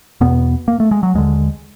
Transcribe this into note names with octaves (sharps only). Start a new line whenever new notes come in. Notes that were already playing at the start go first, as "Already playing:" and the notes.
E2 B2 B3
A#3
A3
G#3
F#3
D#2 D3 G#3